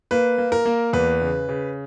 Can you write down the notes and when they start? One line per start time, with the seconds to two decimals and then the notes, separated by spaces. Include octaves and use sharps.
0.11 A#3 B4
0.38 A#3
0.52 A#4
0.65 A#3
0.93 E2 B4
1.22 C#3
1.49 C#3